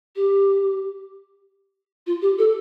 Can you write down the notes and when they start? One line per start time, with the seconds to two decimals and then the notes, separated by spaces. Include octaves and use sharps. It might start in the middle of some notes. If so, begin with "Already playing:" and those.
0.16 G4
2.06 F4
2.22 G4
2.38 A4